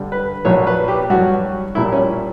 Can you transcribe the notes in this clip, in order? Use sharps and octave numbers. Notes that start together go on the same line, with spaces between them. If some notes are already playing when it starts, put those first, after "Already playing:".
Already playing: G2 D3 G3
B4
A#1 A#2 F#3 C#5
B4
G4
G2 F#3 F#4
A#1 A#2 G3 E4
C#4